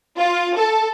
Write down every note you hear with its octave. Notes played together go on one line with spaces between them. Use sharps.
F4
A4